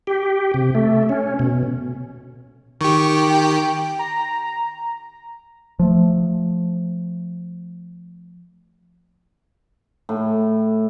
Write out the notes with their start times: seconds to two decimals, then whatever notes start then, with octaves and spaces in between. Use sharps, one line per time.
0.07 G4
0.54 C3
0.75 A3
1.09 C#4
1.39 B2
2.81 D#3 G4 C#6
3.29 G5
3.99 A#5
5.79 F3 A3
10.09 A2